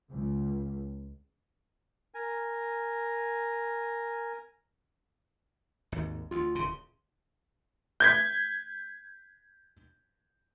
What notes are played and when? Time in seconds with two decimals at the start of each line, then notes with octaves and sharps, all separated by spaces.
0.11 C#2
2.14 A#4 G#5
5.92 G#1 D#2
6.31 D2 F4
6.55 D1 C#3 C6
8.00 G6 G#6 B6